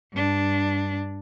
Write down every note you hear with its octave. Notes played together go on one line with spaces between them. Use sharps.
G2 D4